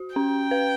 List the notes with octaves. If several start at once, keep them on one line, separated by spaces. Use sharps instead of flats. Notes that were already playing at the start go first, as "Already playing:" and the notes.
Already playing: F#4
C#4 G5
B4